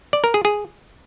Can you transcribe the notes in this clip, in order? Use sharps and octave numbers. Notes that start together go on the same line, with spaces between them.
D5
A#4
G#4
G#4